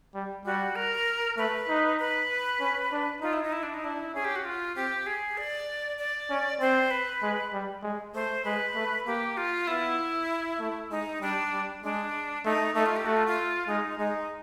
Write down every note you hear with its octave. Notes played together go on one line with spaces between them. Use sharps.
G3
G3 F#4
A#4
A3 B4
D#4
B4
C#4
D4
D#4 F4
E4
D#4
E4
D4
D#4
D4 E4
C#4 G#4
G4
F#4
F4
C4 G4
G#4
D5
D5
C#4
C4 C5
B4
G#3
G3
G#3
A3 C5
G#3 B4
A3
A#3 G4
F4
B3 E4
A3
G#3 D#4
G3 D4
G3
G#3 D4
A3 D#4
A3 D#4
F4
G4
A3 F#4
F4
F4
G#3 D#4
G#3 D#4